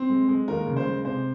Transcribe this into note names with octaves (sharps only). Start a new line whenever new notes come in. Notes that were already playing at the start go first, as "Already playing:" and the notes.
Already playing: C4
G#3
G#3
D#2 A#4
C#3
C5
G#3
C3 C5